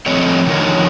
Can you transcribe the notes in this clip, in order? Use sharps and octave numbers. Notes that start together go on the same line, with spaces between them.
F3 A3 C4 C#5 D#5
D3 D#3 F3 D#4 A#4 C#5